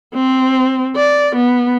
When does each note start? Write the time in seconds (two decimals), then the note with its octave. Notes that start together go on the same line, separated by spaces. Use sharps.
0.14 C4
0.96 D5
1.35 B3